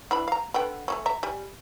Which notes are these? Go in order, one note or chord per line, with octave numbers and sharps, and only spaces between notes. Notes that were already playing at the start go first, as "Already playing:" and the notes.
E3 D4 B5
F5 A#5
D3 B3 G5
A3 A#3 C#4
E5 A#5
G3 G#5